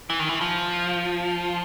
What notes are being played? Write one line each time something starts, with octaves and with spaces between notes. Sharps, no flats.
E3
D#3
E3
F3